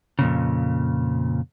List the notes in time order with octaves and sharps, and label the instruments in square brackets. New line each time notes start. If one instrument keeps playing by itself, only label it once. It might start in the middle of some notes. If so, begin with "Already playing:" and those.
[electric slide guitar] F2 A#2 C#3